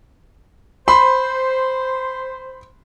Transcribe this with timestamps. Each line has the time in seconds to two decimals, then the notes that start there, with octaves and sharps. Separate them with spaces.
0.88 C5 B5 C6